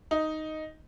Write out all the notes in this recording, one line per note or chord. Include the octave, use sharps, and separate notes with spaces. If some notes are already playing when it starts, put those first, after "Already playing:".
D#4